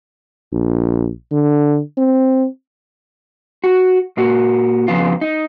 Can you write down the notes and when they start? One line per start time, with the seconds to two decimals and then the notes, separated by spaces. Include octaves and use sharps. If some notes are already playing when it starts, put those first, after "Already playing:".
0.53 A#1
1.32 D3
1.98 C4
3.64 F#4
4.17 A#2 A#3 F#4
4.88 F2 C#3 B3 F4
5.21 D#4